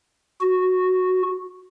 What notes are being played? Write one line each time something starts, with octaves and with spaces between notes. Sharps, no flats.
F#4